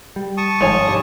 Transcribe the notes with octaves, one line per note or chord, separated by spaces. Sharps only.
G3
A5 C#6 D#6
G1 G#2 D#3 F3 C#5 G#5
B1 G2 G3